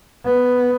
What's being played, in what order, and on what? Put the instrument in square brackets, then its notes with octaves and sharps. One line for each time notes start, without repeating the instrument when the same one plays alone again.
[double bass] B3